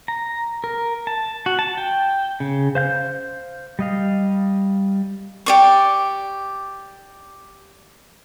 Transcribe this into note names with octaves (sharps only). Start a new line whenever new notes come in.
A#5
A#4
A5
F#4
A5
G5
C#3
C5 F5 G6
G3 D#5 F5
G4 D5 C#6